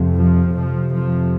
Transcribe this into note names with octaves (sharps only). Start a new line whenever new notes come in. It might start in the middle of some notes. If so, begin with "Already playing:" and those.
Already playing: F2 C3
F3
F2 C3 F3
F3